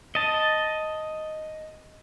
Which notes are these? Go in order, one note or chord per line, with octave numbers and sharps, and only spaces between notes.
D#5 A5